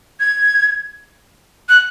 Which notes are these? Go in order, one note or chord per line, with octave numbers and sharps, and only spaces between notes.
G#6
F#6